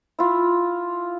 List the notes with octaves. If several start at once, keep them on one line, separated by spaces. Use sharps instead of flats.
E4 F4